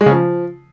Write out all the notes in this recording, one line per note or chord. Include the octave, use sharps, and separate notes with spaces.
G#3
C#3
F3